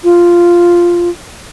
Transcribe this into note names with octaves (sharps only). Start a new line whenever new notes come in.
F4